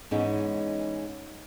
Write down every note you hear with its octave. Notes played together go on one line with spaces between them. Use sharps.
G#2 E3 G#3 B3 C#4 D#4